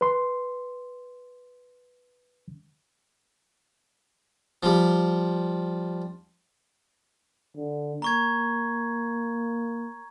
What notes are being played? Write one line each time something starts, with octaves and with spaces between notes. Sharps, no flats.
B4 C6
F3 G3
D3
A#3 A#5 C#6 G#6